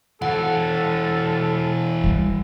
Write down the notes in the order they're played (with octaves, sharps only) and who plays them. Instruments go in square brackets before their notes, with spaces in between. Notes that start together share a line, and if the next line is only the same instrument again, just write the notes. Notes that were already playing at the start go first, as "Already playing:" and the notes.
[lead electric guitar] E3 F#4 [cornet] A4 [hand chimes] F#5
[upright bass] G3